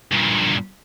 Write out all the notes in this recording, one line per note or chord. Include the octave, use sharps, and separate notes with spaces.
G2 A#2